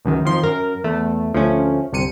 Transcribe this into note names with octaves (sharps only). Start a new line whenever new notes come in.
C#2 F#2 D#3
F2 D#3 F3 C6
F#2 A#4
E2 A3
D2 F3 A3 C#4
G1 C2 C3 C#7 D#7